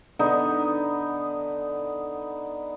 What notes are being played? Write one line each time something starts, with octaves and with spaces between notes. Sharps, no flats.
D3 B3 D#4